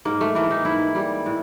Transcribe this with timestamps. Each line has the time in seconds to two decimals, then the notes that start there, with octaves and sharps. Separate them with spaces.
0.05 G#2 A#3
0.21 A3
0.35 E3 A#3
0.51 D#4
0.65 G#2 E4
0.95 G3
1.26 A2